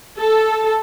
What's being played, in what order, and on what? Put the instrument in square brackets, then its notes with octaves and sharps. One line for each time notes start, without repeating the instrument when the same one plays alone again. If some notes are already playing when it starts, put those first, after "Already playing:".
[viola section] A4